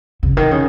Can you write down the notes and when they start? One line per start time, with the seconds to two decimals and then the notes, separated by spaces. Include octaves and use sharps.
0.23 C#3
0.37 D#3
0.51 C#3